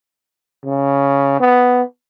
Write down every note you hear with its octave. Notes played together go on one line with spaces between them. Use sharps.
C#3
B3